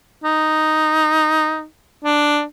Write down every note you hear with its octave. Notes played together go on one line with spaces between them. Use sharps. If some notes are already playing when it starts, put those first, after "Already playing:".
D#4
D4